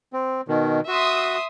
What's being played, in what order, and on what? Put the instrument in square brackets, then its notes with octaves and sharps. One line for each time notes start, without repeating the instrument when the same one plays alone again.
[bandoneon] C4
B2 D#3
[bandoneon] F#4 [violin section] E5 C6 D#6